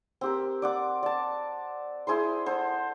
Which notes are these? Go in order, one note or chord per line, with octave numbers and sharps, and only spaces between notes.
C4 G4 A#4
D5 F#5 D6
D5 A5
E4 G#4 C5 C6
A4 C5 F#5